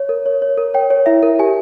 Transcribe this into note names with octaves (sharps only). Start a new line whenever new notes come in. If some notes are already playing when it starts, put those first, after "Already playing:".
Already playing: C#5
A#4
C#5
C#5
A#4
C#5 G5
C#5
E4 E5
A#4
G4 G#5